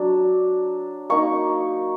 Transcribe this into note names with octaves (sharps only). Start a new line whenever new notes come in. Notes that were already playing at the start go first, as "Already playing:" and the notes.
Already playing: F#3 D4
A#3 D#4 C#6